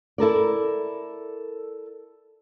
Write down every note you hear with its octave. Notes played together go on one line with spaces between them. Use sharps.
E4 A4 A#4 D5